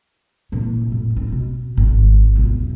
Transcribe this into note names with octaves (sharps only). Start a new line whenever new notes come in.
A#2 E3
F2 A2
D#4
B2
G#1
B1 E2